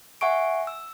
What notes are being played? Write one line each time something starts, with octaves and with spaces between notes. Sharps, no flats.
E5 F#5 G#5 C#6 D7
E6